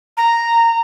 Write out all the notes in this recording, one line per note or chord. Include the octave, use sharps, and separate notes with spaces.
A#5